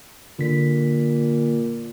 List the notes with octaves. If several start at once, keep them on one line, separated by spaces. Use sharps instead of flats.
A#2 D3 B6